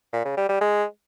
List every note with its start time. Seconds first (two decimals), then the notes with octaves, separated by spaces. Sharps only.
0.13 A#2
0.25 C#3
0.37 G3
0.49 G3
0.61 G#3